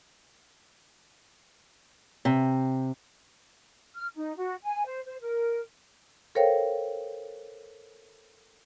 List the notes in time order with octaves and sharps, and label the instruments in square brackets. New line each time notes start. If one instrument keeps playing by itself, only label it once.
[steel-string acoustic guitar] C3
[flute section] F6
D#4
F#4
G#5
C5
C5
A#4
[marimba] A4 A#4 C5 C#5 F5 G5